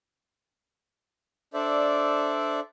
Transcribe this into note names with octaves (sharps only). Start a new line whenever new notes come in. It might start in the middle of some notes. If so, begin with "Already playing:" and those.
D4 A4 C5 D5 E5